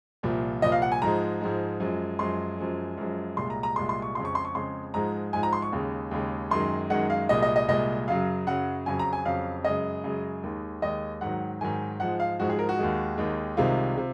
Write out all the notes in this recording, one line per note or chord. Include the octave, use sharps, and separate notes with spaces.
C2 A#2 F3
C2 A#2 F3 D#5
F5
F#5
G#5
G#2 F3 G#3 A#5
G#2 F3 G#3
F#2 F3 G#3
F#2 F3 G#3 C6
F#2 F3 G#3
F#2 F3 G#3
C2 A#2 G#3 C6
A#5
A#5
C2 A#2 G#3 C6
C6
C#6
F2 C#3 G#3 C6
C#6
C6
C#6
F2 C#3 G#3 C6
G#2 F3 G#3 A#5
G#2 F3 G#3 G#5
A#5
C6
C#6
D#2 C#3 G#3
D#2 C#3 G#3
F#2 D#3 G#3 C6
F#2 D#3 G#3 F#5
F5
C2 A#2 G#3 D#5
D#5
D#5
C2 A#2 G#3 D#5
F#2 C#3 F#3 F5
F#2 C#3 F#3 F#5
F2 C#3 F#3 G#5
A#5
G#5
F2 C#3 F#3 F5
F#2 C#3 G#3 D#5
F#2 C#3 G#3
D#2 D#3 G#3
D#2 D#3 G#3 D#5
G#2 D#3 F#3 F#5
G#2 D#3 F#3 G#5
G#2 F3 G#3 F#5
F5
G#2 F3 G#3 F#4
G#4
A#4
F#4
D#2 D#3 G#3
D#2 D#3 G#3
C2 C3 D#3 G#3 F4
C3